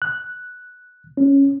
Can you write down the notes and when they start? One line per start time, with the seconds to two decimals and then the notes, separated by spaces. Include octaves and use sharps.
0.02 F#6
1.17 C#4